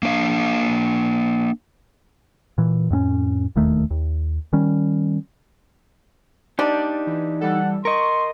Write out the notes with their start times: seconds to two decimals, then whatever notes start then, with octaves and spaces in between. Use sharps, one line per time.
0.03 A#3 D4 F5
2.58 A#2 E3
2.90 F2 A2 C4 C#4
3.56 E1 D#2 D#3 A3
3.91 D#2
4.53 D#3 G3 C#4
6.59 D4 D#4 G4 D5
7.07 E3
7.41 E3 G3 A4 F#5
7.85 A#4 D#5 C6 C#6